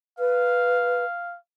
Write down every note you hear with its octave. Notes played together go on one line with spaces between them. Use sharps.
B4 F5